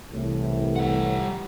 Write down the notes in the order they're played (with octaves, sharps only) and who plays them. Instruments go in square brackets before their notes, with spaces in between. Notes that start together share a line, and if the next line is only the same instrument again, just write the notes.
[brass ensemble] C2 A2 E3
[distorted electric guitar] G3 F#5